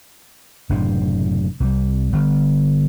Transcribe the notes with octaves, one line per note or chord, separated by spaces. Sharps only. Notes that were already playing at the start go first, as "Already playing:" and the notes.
F#1 A2 C3 D4
C2 G3
G1